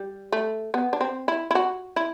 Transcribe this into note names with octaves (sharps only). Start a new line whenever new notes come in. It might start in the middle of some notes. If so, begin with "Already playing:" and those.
Already playing: G3
A3
B3
D4
C4
E4
E4
F#4
E4